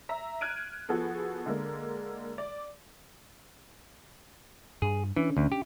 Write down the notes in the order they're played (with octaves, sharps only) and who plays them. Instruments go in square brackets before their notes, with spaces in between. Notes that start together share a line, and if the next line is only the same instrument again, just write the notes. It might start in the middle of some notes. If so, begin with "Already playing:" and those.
[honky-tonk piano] E5 A#5
F6 F#6 G#6 D7 D#7
F3 B3 F#4 G#4 A4
D3 G#3 A#3
D5
[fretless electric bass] G2 [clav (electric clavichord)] G#4
[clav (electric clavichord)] E3 [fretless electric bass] C#4 D4
[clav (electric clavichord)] D2
G4